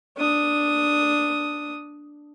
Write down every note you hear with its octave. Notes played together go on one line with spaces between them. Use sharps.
D4 D#6